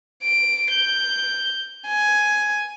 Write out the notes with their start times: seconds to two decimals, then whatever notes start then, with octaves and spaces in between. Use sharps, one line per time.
0.23 D7
0.71 G6
1.87 G#5